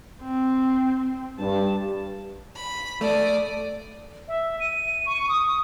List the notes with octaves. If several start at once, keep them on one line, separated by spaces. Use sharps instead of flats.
C4
G2 A5
B5
A3 A4 D5 D#6
E5
D#7
C#6
D#6